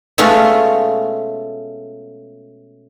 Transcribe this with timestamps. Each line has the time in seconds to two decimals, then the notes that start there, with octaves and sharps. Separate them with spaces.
0.18 B2 G#3 A3 C#4 F4